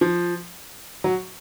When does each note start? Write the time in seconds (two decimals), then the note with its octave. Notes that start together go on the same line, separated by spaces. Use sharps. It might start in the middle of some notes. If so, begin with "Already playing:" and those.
0.01 F3
1.04 F#3